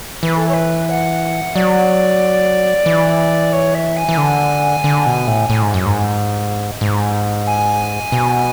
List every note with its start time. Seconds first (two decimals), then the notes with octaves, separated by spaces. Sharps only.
0.23 E3 B4
0.36 A4
0.48 C#5
0.53 B4
0.89 F#5
1.55 F#3 D5
2.86 E3
3.52 C#5
3.74 E5
3.96 G#5
4.09 E3
4.17 D3
4.84 D3
5.06 B2
5.27 A2
5.50 A2
5.62 G#2
5.74 F#2
5.86 G#2
6.81 G#2
7.47 G#5
8.12 B2